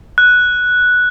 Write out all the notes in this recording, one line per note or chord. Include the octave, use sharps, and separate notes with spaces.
F#6